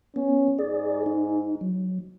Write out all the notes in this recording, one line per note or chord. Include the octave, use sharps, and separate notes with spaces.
B3 C#4
G#2 G#4 D5
D#4
F#3